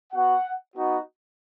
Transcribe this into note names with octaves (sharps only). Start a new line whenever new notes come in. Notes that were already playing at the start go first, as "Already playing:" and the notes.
B3 F#4 F#5
B3 D#4 F#4